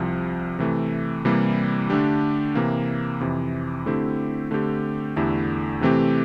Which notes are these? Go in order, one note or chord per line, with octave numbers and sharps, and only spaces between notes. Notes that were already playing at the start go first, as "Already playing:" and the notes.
Already playing: C2 C3 F3
C3 E3 A3
C3 E3 G3 A#3 E4
D3 A3 D4 G4
C3 E3 A#3
F2 C3 E3
D3 A3 C4 E4 G4
D3 A3 C4 G4
E2 D3 A3 E4 G4
C3 E3 A3 C4 G4